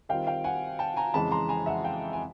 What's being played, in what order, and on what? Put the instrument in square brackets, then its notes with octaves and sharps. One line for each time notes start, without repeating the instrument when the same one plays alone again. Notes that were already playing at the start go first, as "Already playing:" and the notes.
[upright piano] D#3 G3 C4 F4 F5 G5
F5 G5
F#5 G#5
G5 A5
G#5 A#5
F2 C#3 E3 G#3 A5 B5
A#5 C6
G#5 A#5
E5 F#5
F5 G5
G#5